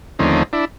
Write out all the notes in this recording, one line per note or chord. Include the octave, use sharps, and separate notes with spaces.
D#2 D3 F3 A3 C4 C#4 D#4
D4 E4